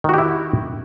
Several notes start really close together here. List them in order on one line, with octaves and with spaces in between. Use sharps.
D#3 F#4 G4 E4